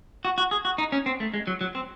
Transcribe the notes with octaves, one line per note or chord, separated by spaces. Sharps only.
F#4
F#4
G#4
F#4
D#4
C#4
C4
A3
G#3
F#3
F#3
C4